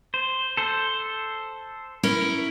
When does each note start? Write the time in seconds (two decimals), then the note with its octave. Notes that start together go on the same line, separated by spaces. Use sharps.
0.14 C5
0.57 A4 C5
2.03 C#4 E4 A#4